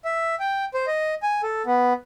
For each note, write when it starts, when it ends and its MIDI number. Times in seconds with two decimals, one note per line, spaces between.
0.05 0.35 76
0.40 0.65 79
0.74 0.86 72
0.87 1.14 75
1.23 1.41 80
1.43 1.62 69
1.66 1.93 59